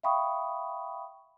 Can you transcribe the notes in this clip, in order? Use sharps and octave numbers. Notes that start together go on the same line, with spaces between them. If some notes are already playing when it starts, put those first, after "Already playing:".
E5 F5 G5 B5 C#6 D#6